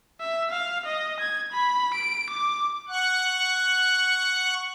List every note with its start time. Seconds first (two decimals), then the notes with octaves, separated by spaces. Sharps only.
0.20 E5
0.51 F5
0.85 D#5
1.20 G#6
1.52 B5
1.94 D7
2.30 D6
2.89 F#5 C#6 F#6